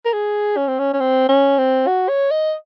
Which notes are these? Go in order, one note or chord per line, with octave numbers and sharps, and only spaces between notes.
A#4
G#4
C#4
C4
C#4
C#4
C4
C#4
C4
F#4
C#5
D#5